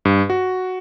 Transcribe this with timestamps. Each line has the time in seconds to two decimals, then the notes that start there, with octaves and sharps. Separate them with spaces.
0.05 G2
0.30 F#4